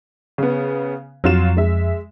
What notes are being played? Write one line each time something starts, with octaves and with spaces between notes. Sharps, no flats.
C#3 B3
F2 F#3 F4 E7
G#3 E5